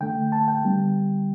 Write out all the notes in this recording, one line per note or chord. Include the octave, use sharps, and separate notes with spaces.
D3 A3 G5
A5
G5
D3 G3 B3